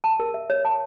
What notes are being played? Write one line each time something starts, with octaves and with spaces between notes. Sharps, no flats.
A5
A#4
E5
C#5
A5